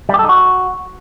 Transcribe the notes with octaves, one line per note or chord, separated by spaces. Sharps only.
G3
G4
A4
D#4
F#4